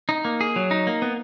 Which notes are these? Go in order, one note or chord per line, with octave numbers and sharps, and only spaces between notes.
D#4
A#3
G#4
F#3
D#4
A#3
B3